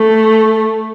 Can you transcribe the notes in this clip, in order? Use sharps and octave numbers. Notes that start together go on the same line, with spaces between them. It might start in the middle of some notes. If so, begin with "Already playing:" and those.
Already playing: A3